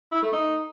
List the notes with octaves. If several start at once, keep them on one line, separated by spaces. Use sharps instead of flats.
E4
A3
D#4